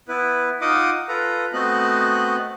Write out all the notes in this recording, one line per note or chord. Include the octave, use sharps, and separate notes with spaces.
B3 E4 B4
D#4 F4 D#5 F#5 D6 D#6
F4 A4 B4 A#5
A3 B3 C4 F#4 D#5 F#6